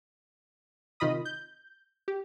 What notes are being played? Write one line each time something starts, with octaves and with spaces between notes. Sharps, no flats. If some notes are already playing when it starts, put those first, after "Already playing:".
C3 D#3 F4 D#5 B5 D#6
G6
G4